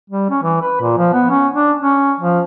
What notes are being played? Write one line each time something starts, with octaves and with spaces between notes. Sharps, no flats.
G3
C#4
E3
B4
A#2
F3
B3
C#4
D4
C#4
F3